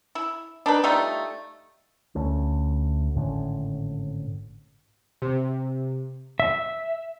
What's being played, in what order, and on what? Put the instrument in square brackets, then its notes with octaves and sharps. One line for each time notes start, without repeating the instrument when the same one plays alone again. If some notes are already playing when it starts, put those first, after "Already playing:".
[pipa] E4
D4 D#4 B4
G3 A3 D#4 F4
[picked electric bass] D2 A3 C#4
G#1 A2 D3 C#4
[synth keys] C3
[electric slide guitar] E5